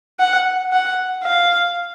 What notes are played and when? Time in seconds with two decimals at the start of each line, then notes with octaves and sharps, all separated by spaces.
0.19 F#5
0.73 F#5
1.24 F5